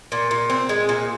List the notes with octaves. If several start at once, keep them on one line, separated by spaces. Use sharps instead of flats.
A#2
A#2
C4
G#3
A#2